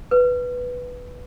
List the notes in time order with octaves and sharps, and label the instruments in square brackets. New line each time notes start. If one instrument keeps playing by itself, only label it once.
[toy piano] B4